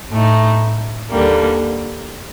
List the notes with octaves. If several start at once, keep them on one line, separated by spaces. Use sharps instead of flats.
A2 A3 D#4
D#2 D3 G3 A#3